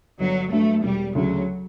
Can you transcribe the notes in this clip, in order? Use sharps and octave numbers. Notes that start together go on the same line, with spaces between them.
G1 F#3
G2 F#3 A3
E1 G3
D2 C#3 F#3